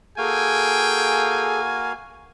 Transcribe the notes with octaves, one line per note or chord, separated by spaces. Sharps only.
A#3 F#4 G#4 A4 F5 G5 G#5